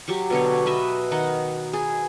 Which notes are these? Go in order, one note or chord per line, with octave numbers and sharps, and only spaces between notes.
F#3 G4 C#6
B2 D3 C#5
B4 D#5 E5
D#3 D#4 F#5
G#4